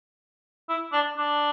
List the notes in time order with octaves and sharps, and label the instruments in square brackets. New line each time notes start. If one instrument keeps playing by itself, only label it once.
[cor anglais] E4
D4
D4